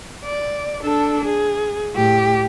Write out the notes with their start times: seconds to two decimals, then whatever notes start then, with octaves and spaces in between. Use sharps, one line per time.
0.25 D5
0.82 D4 A4
1.25 G#4
1.96 A2 G4